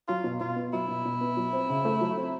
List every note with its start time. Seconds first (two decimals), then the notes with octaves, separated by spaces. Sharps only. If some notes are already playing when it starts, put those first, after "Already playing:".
0.08 F#3 F4
0.24 B2
0.40 B2 F4
0.56 B3
0.73 F#3 E4
0.88 B2
1.05 B2
1.21 B3
1.37 F#3
1.53 C4
1.69 C#3
1.85 A3
2.01 F#3
2.17 C4